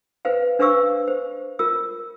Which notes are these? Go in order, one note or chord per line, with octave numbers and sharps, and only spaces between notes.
B4 C5 F5
D4 B4 C5 F5 C#6 E6
C5
F4 A#4 E6